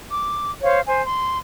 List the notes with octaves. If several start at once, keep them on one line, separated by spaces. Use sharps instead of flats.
D6
C5 C#5 F5
C5 G#5
C6